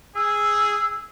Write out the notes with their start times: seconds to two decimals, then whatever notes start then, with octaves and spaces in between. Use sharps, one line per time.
0.16 G#4 E6